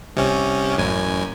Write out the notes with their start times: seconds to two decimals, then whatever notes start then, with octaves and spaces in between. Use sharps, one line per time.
0.16 C2 C3 C#4
0.78 A1 F#2 G#5